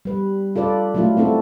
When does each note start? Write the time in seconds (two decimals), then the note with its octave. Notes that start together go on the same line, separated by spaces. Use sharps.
0.05 G3 B4
0.56 F4 A4 B4 D5
0.95 F#3 A3 A#3 E4 F4
1.17 A#3 C4 E4 F#4 A4